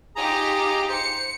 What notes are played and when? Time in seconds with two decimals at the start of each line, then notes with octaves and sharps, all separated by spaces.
0.16 D#4 F4 G4 G#4 A#5
0.90 C5 C#7